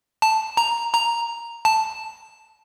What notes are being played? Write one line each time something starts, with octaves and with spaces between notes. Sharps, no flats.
A5
A#5
A#5
A5